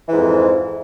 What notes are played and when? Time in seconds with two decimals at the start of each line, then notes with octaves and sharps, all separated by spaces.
0.08 E3
0.12 G#2
0.17 F2